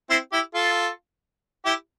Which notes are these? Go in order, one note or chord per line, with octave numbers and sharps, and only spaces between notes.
C4 E4
E4 G4
F4 A4
E4 G4